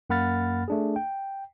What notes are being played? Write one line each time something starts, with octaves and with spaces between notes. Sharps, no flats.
F#2 A#3 F#5 B5 F6 A6
A3 D4 G#4
G5